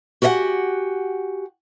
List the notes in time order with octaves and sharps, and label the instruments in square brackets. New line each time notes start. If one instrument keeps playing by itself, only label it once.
[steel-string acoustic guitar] F#4 G4 A#4 D#5 F#5 G#5